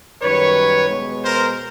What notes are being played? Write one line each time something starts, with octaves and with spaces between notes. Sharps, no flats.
F#2 D#3 G3 B4 C#5
B2 G#3 B3
A#4 C5